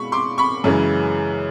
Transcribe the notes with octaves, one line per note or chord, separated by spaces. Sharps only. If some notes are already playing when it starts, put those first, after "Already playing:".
Already playing: B2 G#3 B5 C#6
C6 D6
B5 C#6
F#2 C#3 E3 G#3